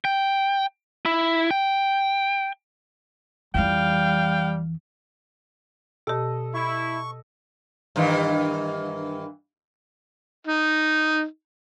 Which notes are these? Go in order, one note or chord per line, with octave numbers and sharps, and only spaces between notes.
G5
E4
G5
F2 E3 G3 F5 G5
B2 G4 A4 D#5
E4 C#6
G2 D#3 E3
D#4